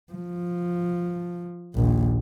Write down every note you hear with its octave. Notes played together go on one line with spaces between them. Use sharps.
F3
A#1 D#2